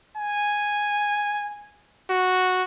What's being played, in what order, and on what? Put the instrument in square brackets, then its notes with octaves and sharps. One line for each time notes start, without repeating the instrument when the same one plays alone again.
[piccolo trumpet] G#5
F#4